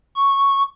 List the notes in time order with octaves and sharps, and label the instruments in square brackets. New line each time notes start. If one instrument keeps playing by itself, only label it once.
[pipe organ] C#6